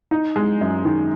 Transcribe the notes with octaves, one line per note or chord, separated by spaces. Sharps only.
D#4
G#3
F#2
D#3